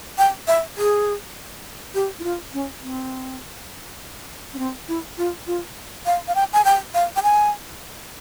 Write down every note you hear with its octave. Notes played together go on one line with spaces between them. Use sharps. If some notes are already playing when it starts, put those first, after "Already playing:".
G5
E5
G#4
G4
E4
F4
C#4
C4
C#4
C4
E4
F4
F4
F5
F5
G5
G#5
G5
F5
G5
G#5